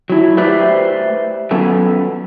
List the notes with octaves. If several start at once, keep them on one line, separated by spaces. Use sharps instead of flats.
F#3 E4
A3 G4 B4 C5 D5 E5
F#3 B3 C#4 A4 B4